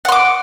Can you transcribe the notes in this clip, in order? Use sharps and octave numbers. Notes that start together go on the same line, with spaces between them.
F#5 C6 D6